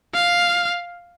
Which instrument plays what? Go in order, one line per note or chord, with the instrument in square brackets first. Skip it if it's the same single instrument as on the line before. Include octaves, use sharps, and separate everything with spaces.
[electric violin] F5